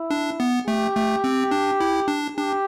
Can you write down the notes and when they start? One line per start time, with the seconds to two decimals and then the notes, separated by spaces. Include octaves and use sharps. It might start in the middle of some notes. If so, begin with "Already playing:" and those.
Already playing: E4
0.11 D4
0.40 B3
0.67 A3 G4
0.96 A3
1.24 C4
1.51 D4
1.80 E4
2.08 D4
2.36 D4 G4